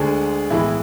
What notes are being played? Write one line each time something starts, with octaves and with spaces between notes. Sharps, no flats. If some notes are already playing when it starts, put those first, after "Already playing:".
Already playing: D2 D3 G#3 G#4
B1 A2 E3 G#3 E4